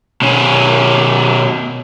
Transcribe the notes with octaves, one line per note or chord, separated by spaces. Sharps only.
B2 C#4